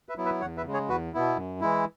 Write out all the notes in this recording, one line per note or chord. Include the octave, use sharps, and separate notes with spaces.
B4 E5
F#3 B3 E4
B4 E5
E2 C#5 F#5
B4 E5
C#3 G#3
G#4 C#5
E2 F#4 B4
B2 B3 E4
F#2
E3 G#3 E4